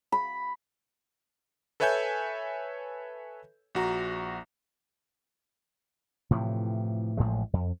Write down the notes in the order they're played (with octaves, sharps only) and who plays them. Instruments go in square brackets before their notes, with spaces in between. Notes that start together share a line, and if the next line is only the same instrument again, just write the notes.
[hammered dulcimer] B5
[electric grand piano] A4 B4 C#5 E5 G#5 G6
A#1 F#4 A#5
[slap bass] A2 C3 E3 F3
A1 A2 F3 G#3
F2